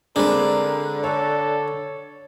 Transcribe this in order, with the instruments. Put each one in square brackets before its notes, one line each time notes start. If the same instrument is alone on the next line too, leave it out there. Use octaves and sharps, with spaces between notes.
[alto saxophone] D3 [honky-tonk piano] G#3 C4 G#4 [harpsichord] D4 B4 [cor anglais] A#4
[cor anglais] A4 [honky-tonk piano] C#5